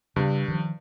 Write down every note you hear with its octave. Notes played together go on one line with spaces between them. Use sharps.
G2 C#3 G3 B3
D#3 F3